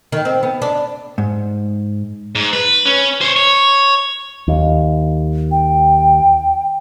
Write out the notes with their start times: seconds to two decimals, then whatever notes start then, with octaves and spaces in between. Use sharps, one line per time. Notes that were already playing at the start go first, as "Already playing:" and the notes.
0.12 D#3
0.25 C4
0.43 B3
0.62 D4
1.18 G#2
2.35 G#2
2.53 B4
2.86 C#4
3.21 C5 C#5
3.36 C#5
4.48 D#2
5.51 G5